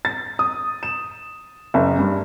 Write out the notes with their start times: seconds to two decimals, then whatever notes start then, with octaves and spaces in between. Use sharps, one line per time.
0.05 A6
0.39 D#6
0.83 E7
1.74 F#1
1.99 G2